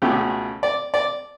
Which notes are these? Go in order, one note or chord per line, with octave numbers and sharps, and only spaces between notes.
C#2 B2 A3 C#4 G4
D5
D5